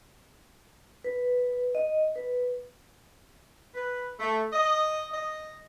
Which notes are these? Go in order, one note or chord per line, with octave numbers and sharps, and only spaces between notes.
B4
D#5
B4
B4
A3
D#5
D#5